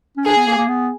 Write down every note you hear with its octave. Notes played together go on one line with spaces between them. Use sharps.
C#4
D4 G#4
B3
A#3
A#3
B3